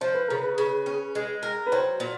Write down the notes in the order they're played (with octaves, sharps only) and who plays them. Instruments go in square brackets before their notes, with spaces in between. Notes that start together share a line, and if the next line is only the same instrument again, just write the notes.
[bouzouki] F3 [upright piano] C5
[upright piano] B4
[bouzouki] C#3 [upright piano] A#4
[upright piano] B4
[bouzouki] C#3
C#4
G#3
A#4
[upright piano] B4
[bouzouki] F#3 [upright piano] C5
[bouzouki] A#2